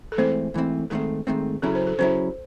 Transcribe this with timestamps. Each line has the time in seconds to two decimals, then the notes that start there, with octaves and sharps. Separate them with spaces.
0.12 A4
0.18 G#2 E3 A3 C4 C5
0.54 G#2 E3 A3 C4
0.90 G#2 D#3 A3 C4 A4
1.27 G#2 D#3 A3 C4
1.62 C#3 F#3 C#4 E4 A4
1.75 C5
1.87 A4
1.99 C#3 F#3 C#4 E4 C5